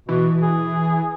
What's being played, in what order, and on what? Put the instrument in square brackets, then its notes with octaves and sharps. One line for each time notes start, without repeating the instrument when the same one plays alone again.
[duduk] B2 [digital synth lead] E3
[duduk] G#4